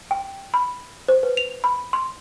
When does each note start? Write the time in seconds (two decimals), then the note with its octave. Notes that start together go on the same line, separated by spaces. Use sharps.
0.11 G5
0.54 B5
1.08 C5
1.23 B4
1.37 F7
1.64 B5
1.93 C6